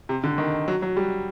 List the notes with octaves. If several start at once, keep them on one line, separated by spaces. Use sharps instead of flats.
C3
D3
D#3
F#3
F#3
G3